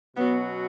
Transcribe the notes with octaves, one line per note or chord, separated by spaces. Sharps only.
B2 F#3 B3 C#4 F#4